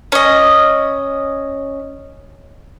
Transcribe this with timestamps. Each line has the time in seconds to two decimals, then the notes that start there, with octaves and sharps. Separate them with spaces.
0.12 C#4 D#5